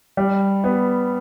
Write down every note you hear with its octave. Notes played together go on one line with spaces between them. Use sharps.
G3
B3